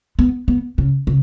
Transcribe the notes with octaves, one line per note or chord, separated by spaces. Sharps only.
B3
B3
C#3
C#3